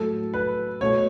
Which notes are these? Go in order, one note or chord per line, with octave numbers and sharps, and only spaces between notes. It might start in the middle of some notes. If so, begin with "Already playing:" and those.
Already playing: A2 F#3 A3 A4
B4
B2 A3 C#5